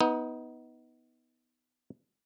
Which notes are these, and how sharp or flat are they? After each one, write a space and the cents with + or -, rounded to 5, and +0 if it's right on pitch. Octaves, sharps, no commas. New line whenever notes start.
B3 +0 D#4 +25